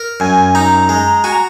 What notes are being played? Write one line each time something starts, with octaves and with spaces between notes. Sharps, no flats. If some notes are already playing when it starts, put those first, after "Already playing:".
Already playing: A#4
F#2 G#5
D#4 A#5
G#3
F#4 G#5
A#5